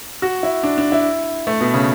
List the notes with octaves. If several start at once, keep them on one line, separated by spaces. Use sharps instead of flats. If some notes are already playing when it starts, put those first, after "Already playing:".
F#4
E4
D4
D4
E4
A3
B2
C#3